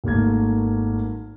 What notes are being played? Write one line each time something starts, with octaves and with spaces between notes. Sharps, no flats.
G#1 A3 A#3 G#6